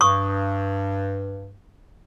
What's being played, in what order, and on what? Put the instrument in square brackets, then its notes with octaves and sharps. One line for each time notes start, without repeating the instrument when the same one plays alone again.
[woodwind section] G2 [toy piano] C#6 D#6